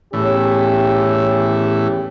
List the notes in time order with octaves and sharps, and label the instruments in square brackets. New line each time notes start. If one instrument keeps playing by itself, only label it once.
[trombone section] E2 C#4 G4 [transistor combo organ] A2 E3